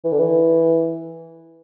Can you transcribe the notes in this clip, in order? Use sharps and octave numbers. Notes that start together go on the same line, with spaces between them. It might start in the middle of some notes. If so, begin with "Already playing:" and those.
E3
D3
E3